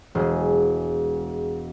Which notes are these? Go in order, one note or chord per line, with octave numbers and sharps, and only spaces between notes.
E1 G#3